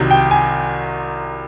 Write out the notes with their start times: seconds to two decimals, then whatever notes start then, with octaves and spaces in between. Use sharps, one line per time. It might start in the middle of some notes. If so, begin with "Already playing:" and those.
Already playing: C2 C3 D#3 F#3
0.11 G5
0.31 G#5